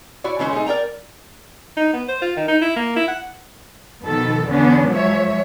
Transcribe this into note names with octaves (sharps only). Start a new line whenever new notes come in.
E4 F#4 C#5 D5
C#3 E3 G#3 C#4 D4 C5
G#3 A3 C4 D#4 G#4
A#4 D5 G5 A#5
D#4
B3
C5
F4
D#3
D#4
E4
A#3
E4
F#5
B2 D#3 F3 B3 A4
E2 D3 B3 C#4 D4
F3 F#3 G#3 C#5 E5